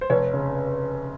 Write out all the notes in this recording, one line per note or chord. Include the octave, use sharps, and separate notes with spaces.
C5
F1 C#5
C#3